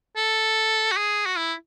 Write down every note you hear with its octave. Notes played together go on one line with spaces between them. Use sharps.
A4
F#4
G#4
F#4
E4